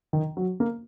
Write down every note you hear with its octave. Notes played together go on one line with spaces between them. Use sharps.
D#3
F#3
A#3